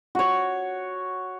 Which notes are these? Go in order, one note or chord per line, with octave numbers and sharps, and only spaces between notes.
F#4 C#5